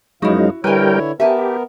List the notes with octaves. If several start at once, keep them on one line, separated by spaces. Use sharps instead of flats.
F#2 F3 F#3 G#3 D#4 E4 F#4 F5
D3 G3 E4 A#4 B4 C#5 G5 G#5
B3 G4 A#4 E5 G#5 A5